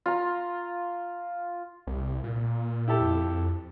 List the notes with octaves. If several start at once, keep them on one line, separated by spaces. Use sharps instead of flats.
F4 A#5
C2
A#2
E4 G4 A4
F2